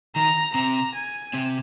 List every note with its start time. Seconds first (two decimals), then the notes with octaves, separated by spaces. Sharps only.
0.16 D#3 A#5
0.55 C3 C4 A#5
0.95 G#5
1.34 C3 C4